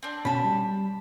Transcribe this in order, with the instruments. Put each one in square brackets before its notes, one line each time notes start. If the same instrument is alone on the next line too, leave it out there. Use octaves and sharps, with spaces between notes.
[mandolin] C4 D4
[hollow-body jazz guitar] B2 C#4 [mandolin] A5 B5
[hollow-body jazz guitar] G3